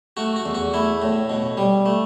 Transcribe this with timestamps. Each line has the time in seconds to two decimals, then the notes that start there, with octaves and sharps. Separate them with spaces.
0.17 A3 F#4
0.36 F#4
0.45 E2
0.54 F#4
0.74 A3 E4
1.02 A2
1.30 B2
1.57 G3
1.86 A3